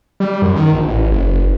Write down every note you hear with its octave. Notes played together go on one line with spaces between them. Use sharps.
G3
F#2
D#3
A#1
A1
F#1